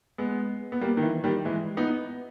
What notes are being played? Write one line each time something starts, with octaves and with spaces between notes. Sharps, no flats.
G#3 B3
B3
G3 A#3
D#3
E3
D#3 G3
E3 G#3
B3 D#4